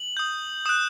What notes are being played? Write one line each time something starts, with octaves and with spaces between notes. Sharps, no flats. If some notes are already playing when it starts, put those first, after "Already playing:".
Already playing: F#7
D#6 G6
D#6 F#6 E7